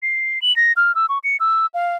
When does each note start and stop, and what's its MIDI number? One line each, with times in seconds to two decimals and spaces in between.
0.03 0.39 96
0.42 0.55 102
0.56 0.73 94
0.77 0.95 89
0.95 1.06 88
1.09 1.18 85
1.24 1.37 97
1.40 1.66 88
1.74 1.97 77